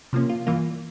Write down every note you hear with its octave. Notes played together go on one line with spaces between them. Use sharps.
C3 F3 A#3 C#4
F4
G2 E3 A#3 F4